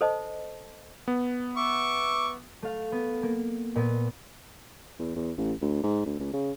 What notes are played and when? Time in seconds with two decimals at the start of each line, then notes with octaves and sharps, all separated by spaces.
0.01 A4 C5 D#5 A5
1.08 B3
1.57 E5 C#6 D6
2.62 A3 F5
2.92 B3
3.23 A#3
3.76 A#2 B3
4.99 E2
5.15 E2
5.38 A1
5.61 D2
5.83 G#2
6.06 D2
6.20 C#2
6.33 C#3